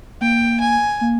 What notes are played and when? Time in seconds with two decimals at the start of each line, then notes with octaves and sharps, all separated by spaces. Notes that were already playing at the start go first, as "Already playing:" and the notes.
0.21 A#3 G5
0.60 G#5
1.01 A#3